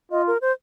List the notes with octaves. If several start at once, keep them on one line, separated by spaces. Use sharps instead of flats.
F4 D#5
A#4
C5